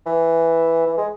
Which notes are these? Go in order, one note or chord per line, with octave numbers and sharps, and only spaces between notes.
E3
E3
G#3